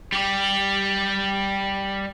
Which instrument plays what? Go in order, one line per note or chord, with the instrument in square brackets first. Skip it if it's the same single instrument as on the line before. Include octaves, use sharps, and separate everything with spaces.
[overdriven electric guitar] G3 G4